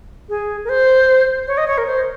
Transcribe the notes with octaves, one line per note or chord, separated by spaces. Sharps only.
G#4
A#4
C5
C#5
D#5
C#5
A#4
C5